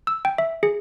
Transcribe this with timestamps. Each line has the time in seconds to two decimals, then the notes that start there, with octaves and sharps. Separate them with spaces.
0.07 E6
0.25 G5
0.38 E5
0.63 G#4